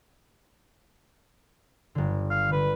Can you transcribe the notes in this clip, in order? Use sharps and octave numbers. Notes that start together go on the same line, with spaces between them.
G1 D3
F5
D3 B4